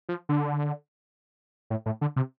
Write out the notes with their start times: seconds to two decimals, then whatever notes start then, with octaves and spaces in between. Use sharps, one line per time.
0.09 F3
0.29 D3
1.70 A2
1.86 A2
2.01 D3
2.16 C3